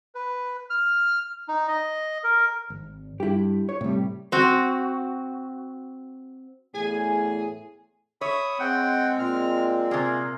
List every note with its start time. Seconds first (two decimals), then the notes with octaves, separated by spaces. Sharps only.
0.15 B4
0.70 F6
1.48 D#4
1.68 D#5
2.24 A#4
2.70 G#1
3.20 G2 E4 G4
3.69 C#5
3.81 A2 C3 G3
4.32 C4 F#4
6.74 E2 A2 G#4 G#5
8.21 C#5 E5 B5 D#6
8.60 G#3 C4 F#5 G5
9.19 A#2 F6
9.91 C3 A#3 G#4